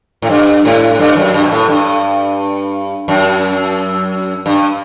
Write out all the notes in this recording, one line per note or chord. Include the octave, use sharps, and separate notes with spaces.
A2
G2
A2
G2
F#2
G2
B2
A2
G2
F#2
G2